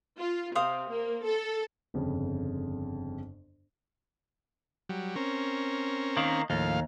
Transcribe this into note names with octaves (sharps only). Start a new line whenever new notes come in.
F4
C3 C5 F5 D#6
A#3
A4
G1 F2 C#3
F#3 G3
C4 C#4 A#4
D#3 A#3
D#2 A2 F3 F5